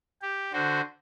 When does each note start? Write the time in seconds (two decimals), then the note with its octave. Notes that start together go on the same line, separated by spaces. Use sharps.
0.22 G4
0.53 D3 F#4 C5